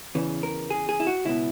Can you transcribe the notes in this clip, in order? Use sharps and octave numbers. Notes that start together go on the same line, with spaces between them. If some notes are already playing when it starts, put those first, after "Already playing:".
E2 C#3 E3
A#4
G#4
G#4
E4
F#4
C#2 B2 E4